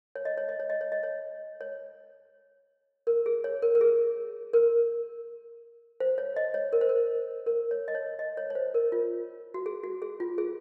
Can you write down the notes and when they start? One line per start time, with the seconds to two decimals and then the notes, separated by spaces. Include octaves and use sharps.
0.15 C#5
0.25 D#5
0.38 C#5
0.49 D#5
0.60 C#5
0.70 D#5
0.81 C#5
0.92 D#5
1.03 C#5
1.61 C#5
3.07 A#4
3.26 G#4
3.44 C#5
3.62 A#4
3.75 A#4
3.81 G#4
4.53 A#4
6.00 C5
6.18 C#5
6.36 D#5
6.54 C#5
6.73 A#4
6.81 C5
6.89 A#4
7.46 A#4
7.71 C#5
7.88 D#5
7.95 C#5
8.19 D#5
8.37 C#5
8.50 C#5
8.55 C5
8.74 A#4
8.92 F4
9.54 F#4
9.66 G#4
9.84 F#4
10.02 G#4
10.20 F4
10.38 G#4